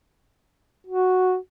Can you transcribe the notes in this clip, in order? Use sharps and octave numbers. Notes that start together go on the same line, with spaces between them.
F#4